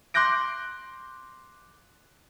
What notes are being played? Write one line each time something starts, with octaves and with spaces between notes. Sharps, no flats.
C6 D6 F#6 G6 A#6 D7